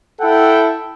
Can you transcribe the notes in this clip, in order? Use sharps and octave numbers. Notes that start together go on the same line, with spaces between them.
E4 A4 F#5 G5